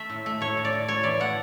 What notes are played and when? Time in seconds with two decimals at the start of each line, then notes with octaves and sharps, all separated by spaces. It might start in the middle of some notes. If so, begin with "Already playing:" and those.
Already playing: A3 E5
0.10 A2
0.26 A3
0.41 A2 C#5
0.57 A2
0.65 D5
0.73 A2
0.88 A2 C#5
1.03 E3 D5
1.20 A3 F#5